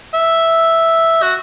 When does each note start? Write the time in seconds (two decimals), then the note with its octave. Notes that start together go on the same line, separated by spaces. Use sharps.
0.14 E5
1.22 F#4